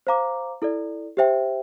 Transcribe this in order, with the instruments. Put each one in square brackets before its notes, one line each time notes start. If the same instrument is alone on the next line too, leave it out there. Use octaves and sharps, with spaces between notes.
[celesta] C5 F5 A#5 D6
E4 A4 D5
G4 C5 E5 G5